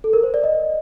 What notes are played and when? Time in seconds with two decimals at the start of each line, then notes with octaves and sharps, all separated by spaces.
0.04 A4
0.13 A#4
0.23 C5
0.34 D5
0.44 D#5